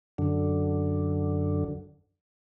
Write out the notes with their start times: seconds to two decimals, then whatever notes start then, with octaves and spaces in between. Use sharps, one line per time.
0.18 F#2 D3